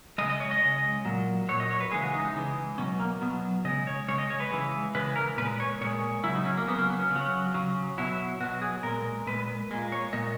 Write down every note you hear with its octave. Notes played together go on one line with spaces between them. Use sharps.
C#3 G#3 D#5
D#5
C#5
D#5
C#3 G#3
A#2 F#3
A#2 F#3 C#5
D#5
C#5
B4
C#3 E3 G#3 G#4
F#4
D#4
D#4
C#3 E3 G#3
B2 F#3 C#4
A#3
B2 F#3 B3
C#3 G#3 D#5
C#5
C#3 G#3 C#5
D#5
C#5
B4
C#3 E3 G#3
C#3 E3 G#3 B4
A#4
A#2 G#3 B4
C#5
A#2 G#3 C#5
C#3 F#3 E4
D#4
C#4
A#3
C#3 F#3 B3
A#3
B3
C#4
C#3
F#3
C#3 F#3
B2 F#3 E4
B2 F#3 F#4
G#4
A#2 G#3 A#4
A#2 G#3 B4
A#2 G#3
C#5
A#2 G#3 D#5